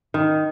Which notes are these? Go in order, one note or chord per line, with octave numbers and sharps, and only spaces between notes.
D#3